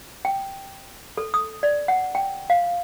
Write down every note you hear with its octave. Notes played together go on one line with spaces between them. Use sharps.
G5
A4
D#6
D5
F#5
G5
F5